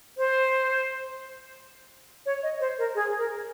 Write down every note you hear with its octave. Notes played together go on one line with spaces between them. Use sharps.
C5
C#5
D#5
C5
A#4
G#4
A#4